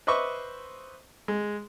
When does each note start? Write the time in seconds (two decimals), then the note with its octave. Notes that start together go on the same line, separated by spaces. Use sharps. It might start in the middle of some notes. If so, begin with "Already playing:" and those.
0.07 B4 C5 D#5 E5 C#6 D6
1.28 G#3